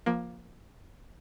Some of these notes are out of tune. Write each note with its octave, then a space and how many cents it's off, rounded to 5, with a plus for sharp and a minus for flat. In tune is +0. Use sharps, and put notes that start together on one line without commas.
F3 +0 A#3 +15